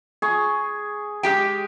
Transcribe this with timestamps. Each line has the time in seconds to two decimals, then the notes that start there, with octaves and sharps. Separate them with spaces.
0.22 G#4 C#6
1.23 G#3 G4 G5